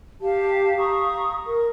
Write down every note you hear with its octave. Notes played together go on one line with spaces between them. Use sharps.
G4 F5 A5
A#5 C#6 D#6
A#4